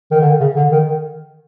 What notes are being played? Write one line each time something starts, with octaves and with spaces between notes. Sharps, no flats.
D#3
D3
C#3
D3
D#3